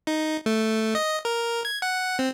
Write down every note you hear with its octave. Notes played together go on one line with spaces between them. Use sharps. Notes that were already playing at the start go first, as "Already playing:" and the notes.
D#4
A3
D#5
A#4
G#6
F#5
C4